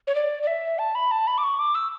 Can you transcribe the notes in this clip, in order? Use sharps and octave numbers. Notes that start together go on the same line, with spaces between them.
C#5
D5
D5
E5
A5
B5
A5
B5
D6
C#6
D6
E6